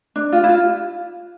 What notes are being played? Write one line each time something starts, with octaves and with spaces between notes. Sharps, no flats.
D4
F4
E4
F4